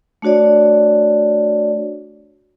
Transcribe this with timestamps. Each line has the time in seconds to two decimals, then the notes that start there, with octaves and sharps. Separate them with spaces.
0.22 A3 D4 F#4 C#5 D5